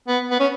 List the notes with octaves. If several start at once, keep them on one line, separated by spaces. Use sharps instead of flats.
B3
B3
C#4